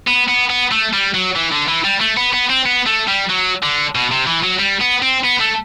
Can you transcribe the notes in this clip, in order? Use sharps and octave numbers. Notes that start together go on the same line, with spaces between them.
B3
B3
B3
A3
G3
F#3
E3
D3
E3
G3
A3
B3
B3
C4
B3
A3
G3
F#3
D3
B2
C3
E3
F#3
G3
B3
C4
B3
A3